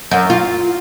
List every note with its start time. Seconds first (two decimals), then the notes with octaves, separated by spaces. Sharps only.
0.11 F#2
0.30 F4